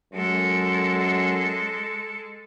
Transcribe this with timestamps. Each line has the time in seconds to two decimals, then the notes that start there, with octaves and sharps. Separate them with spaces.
0.13 F#2 G#3 A4